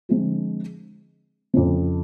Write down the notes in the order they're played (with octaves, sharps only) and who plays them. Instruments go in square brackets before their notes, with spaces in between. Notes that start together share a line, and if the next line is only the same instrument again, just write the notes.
[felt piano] D3 F3 G#3 C4 F4
F2 C#3 F3